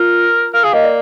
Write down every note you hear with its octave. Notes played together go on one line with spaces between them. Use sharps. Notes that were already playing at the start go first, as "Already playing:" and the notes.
Already playing: F4 A#4
A#4 F5
G#4 F5
A#3 D#5
D5